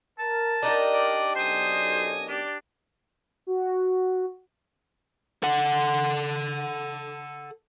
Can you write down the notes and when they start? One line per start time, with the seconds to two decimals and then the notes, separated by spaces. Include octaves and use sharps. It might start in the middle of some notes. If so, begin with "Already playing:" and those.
0.19 A#4 A5
0.63 D4 D#4 G4 D#5
0.93 D5
1.36 B1 F#2 C5 D#5 G#5 D#6
2.29 D4 G4 D5
3.47 F#4
5.43 A4 F#5